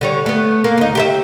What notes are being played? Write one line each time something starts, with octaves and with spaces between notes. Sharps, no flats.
D3 G3 C#5
A3 B3
A#3
D2 D#4
G4 A4 E5